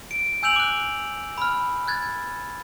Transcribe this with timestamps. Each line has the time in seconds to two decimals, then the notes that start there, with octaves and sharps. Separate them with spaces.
0.11 D7
0.43 G#5 E6 G6 D7 F7 F#7
0.56 D6 F#6
1.38 B5 F6
1.88 F#6 G#6 A6